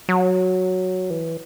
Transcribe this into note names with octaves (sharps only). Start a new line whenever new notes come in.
F#3
E3